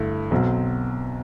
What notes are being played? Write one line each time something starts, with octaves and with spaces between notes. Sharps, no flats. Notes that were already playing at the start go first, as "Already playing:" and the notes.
Already playing: G2 D3 A3 E4
B1 B2 F#3 C4